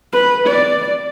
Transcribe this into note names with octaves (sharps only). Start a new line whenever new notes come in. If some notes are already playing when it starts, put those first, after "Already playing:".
B4
D5